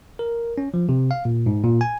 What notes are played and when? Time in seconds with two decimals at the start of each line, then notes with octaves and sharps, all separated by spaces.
0.19 A#4
0.58 C#4
0.74 F3
0.89 C3
1.11 F5
1.25 A#2
1.46 G#2
1.64 A#2
1.81 G#5